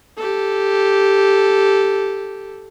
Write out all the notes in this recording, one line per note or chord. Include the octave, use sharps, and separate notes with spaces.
G4 A4